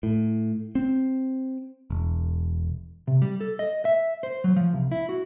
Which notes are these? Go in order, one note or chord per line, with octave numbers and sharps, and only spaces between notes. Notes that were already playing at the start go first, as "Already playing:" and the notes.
A2
C4
E1
C3
G3
A4
D#5
E5
C5
F#3
F3
C2
E4
F#4